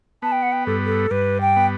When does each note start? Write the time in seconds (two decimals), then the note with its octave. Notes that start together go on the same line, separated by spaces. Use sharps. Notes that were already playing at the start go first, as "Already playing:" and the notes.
0.22 B3 A5
0.32 G5
0.42 F#5
0.52 G5
0.66 G2 A4
0.86 A4
1.11 G2 B4
1.41 G5
1.56 B3